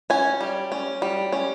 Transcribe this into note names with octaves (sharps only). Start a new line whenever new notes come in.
C#4 G#5
G3
C#4
G3
C#4